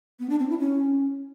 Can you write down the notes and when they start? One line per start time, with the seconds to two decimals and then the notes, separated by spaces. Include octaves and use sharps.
0.20 B3
0.30 D4
0.40 C4
0.50 E4
0.60 C#4